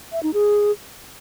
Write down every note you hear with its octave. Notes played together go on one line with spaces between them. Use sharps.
E5
D#4
G#4